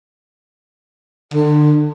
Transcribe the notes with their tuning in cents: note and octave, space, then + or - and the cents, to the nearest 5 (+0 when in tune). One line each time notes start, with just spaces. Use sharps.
D3 +35